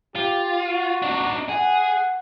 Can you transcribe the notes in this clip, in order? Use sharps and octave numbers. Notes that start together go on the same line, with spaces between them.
F4 G4
F#4
D4 D#4
G#4 F#5